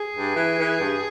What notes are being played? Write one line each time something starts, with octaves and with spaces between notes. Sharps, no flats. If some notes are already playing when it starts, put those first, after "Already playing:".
Already playing: G#4
G2
E3
E3
G2